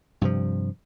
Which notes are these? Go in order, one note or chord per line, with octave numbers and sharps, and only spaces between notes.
G2 C3 F3